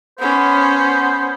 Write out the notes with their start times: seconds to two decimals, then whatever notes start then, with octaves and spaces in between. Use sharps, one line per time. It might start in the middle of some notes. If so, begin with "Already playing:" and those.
0.19 B3 C#4 C5